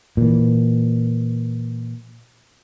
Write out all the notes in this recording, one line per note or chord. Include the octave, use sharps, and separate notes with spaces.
A#2 E3